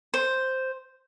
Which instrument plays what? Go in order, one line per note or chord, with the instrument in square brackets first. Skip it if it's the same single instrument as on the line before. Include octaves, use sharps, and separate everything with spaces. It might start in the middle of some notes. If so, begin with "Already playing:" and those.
[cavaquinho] C5